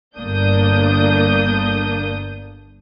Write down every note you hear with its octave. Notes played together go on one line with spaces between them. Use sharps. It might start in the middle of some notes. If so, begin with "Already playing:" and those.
G1 D3 A#3 D4 D#6 G6